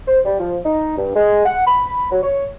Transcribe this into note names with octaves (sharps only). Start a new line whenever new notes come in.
C5
G3
F3
D#4
G2
G#3
F#5
B5
F#3
C#5